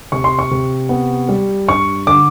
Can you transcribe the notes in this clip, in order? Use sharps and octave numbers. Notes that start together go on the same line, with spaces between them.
C3 C#6
C6
C#6
C3
B3
G3
G2 C#6
D3 D6